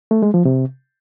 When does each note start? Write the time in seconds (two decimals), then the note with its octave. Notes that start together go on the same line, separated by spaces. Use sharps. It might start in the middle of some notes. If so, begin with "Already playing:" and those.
0.11 A3
0.22 G#3
0.34 F3
0.45 C3